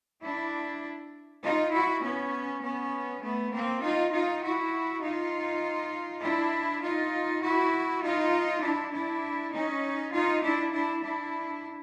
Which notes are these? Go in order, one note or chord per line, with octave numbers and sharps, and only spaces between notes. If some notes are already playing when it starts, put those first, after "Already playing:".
D4 E4
D#4 F4
E4 F#4
B3 C#4
B3 C#4
A3 B3
A#3 C4
D#4 F4
D#4 F4
E4 F#4
D#4 F4
D4 E4
D#4 F4
E4 F#4
D#4 F4
D4 E4
D4 E4
C#4 D#4
D#4 F4
D4 E4
D4 E4
D4 E4